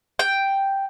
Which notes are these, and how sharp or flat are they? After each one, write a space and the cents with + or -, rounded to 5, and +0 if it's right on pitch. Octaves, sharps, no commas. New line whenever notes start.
G5 +0